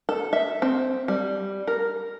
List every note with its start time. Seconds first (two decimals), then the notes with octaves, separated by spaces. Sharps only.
0.09 A4
0.33 E5
0.62 C4
1.08 G3
1.67 A#4